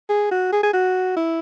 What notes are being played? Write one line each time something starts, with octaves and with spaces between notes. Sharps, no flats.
G#4
F#4
G#4
G#4
F#4
E4